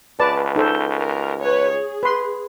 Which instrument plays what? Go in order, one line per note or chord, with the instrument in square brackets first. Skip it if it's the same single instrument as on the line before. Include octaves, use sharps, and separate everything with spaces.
[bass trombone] C#2 [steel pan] B4 D5 A5
[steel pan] D#4 A4 C5
[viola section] A#4
B4 C#5
G#4
[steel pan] B4 C6